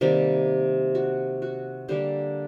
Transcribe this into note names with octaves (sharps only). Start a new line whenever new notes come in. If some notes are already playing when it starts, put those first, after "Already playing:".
C3 D#3 G3 A#3
F#4
F#4
D3 G3 A#3 G4